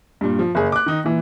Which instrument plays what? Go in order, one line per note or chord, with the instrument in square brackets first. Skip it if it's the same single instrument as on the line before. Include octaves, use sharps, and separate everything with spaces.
[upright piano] G2 A#2
F3
F#1 G#4
D6 F#6
D#3 D#4
A#2 E3